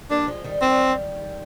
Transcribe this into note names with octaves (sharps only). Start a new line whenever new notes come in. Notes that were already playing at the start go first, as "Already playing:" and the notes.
G3 A#3 D4
F3 G#3
D#3 G3
D#3 G3 C4